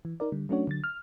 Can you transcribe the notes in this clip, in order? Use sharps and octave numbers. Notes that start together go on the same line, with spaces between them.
E3
D#4 A#4 D5
D3 G3
F#3 A3 C#4 D4 F#4 C#5
D3 F#3 A6
F6